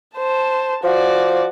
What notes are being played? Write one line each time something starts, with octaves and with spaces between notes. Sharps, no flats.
C5 A5
F3 F#4 D5